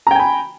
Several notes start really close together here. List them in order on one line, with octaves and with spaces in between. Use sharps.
A#5 G5 G#5 B5